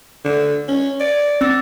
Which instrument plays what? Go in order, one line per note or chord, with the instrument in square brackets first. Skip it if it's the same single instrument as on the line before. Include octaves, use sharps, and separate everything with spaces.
[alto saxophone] D3
C#4
D5
[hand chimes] C4 E6 A6